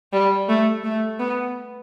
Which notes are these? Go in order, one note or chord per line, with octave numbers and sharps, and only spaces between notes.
G3
A3
A3
B3